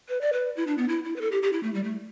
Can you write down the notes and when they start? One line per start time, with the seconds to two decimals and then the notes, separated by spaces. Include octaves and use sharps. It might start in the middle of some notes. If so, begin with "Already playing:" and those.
0.09 B4
0.21 D5
0.33 B4
0.57 E4
0.67 D4
0.78 B3
0.89 E4
1.05 E4
1.16 B4
1.21 A4
1.32 G4
1.43 G4
1.53 E4
1.63 A3
1.74 G3
1.84 A3